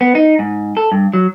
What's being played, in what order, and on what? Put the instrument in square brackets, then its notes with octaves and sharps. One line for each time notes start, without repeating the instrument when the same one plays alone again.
[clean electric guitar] B3
D#4
G#2
A4
G2
F#3